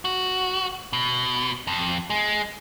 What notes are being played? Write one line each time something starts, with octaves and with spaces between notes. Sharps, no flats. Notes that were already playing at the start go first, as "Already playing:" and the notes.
F#4
B2
F2
G#3